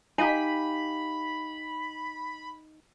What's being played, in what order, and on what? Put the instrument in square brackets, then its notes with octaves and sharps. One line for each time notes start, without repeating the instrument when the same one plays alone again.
[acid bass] D#4 [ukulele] G4 F5 G#5 [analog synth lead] B5